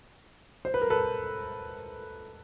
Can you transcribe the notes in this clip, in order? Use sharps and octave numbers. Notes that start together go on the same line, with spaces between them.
C5
B4
A#4
A4 B4